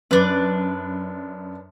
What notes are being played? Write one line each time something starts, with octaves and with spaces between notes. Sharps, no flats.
F#2 D4 B4